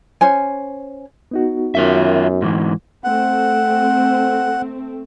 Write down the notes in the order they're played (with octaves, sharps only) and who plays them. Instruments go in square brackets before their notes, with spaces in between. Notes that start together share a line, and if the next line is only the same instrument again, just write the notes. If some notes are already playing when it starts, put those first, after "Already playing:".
[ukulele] C#4 C5 G#5
[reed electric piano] B3 D#4 F#4
[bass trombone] F#2 [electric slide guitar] F4 A#4 E5
[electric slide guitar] G#2 E3
[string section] A3 C4 [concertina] F#5